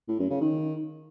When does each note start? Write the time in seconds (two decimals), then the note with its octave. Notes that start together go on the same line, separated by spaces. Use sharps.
0.08 A2
0.19 F#2
0.30 C#3
0.41 D#3